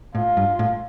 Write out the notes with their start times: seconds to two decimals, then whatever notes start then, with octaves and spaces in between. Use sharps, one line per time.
0.15 A2 F4
0.37 G2
0.59 A2